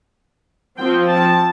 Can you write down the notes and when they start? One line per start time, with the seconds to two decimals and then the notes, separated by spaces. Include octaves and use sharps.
0.78 F3 C4 G5
1.10 A5